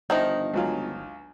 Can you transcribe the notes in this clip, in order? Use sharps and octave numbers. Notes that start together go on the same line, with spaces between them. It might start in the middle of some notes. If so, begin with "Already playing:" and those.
G1 D#3 F3 D4 D#4 D#5 E5
C#2 F#3 F4